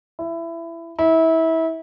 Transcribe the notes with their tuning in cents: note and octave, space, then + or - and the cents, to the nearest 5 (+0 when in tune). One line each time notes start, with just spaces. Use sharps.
E4 +20
E4 -25